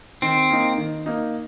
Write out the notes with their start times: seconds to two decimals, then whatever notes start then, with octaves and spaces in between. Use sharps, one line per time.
0.22 D#3 C4
0.50 A#3 D#4
0.78 D#3
1.06 A#3 D#4